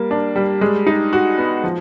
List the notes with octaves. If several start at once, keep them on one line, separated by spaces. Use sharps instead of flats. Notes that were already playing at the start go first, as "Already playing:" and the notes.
Already playing: G3 A#3
D4
G3
G#3
D#4
F#4
B3
F3